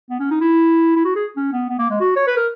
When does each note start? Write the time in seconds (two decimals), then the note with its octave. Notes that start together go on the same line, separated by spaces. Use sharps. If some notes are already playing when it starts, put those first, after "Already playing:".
0.10 B3
0.20 C#4
0.31 D#4
0.41 E4
0.96 E4
1.05 F#4
1.16 G#4
1.37 C#4
1.53 B3
1.69 B3
1.79 A#3
1.90 G#3
2.01 F#4
2.16 C#5
2.27 B4
2.37 A#4